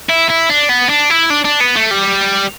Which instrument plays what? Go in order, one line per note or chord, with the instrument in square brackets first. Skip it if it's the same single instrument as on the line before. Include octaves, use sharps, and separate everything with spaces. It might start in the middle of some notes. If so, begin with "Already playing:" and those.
[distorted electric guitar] E4
E4
D4
B3
D4
E4
D4
D4
B3
A3
G3